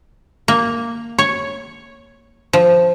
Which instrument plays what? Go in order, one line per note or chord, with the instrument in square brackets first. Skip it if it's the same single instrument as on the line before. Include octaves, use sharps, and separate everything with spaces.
[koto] A#3
C#5
F3